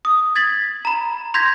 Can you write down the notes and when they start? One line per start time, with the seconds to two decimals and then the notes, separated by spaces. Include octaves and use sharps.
0.05 D#6
0.35 G#6 A6 B6 F#7
0.85 A#5 B5
1.34 C6 G6 G#6 A#6 B6